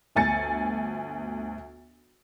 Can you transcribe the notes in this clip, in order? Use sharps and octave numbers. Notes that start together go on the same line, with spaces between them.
G1 D2 G#5 A6 C#7